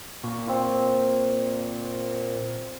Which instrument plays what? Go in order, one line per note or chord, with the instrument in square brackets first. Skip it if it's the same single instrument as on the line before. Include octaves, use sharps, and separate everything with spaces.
[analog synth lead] A#2 [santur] C#6
[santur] C4 F4